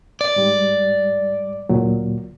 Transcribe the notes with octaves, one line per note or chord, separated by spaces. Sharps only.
D5
G#2 G3
D2 A#2 F#3